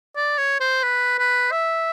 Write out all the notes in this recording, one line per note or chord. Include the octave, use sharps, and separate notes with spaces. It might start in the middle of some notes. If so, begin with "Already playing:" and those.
D5
C#5
C5
B4
B4
E5